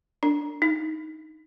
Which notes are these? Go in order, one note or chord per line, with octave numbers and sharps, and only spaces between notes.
D4
D#4